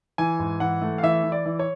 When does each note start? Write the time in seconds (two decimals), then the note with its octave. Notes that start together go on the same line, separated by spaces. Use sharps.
0.18 E3 G#5
0.39 G#2
0.60 E3 F#5
0.82 A3
0.98 F5
1.03 E3 E5
1.24 E3
1.32 D5
1.46 E3
1.59 C#5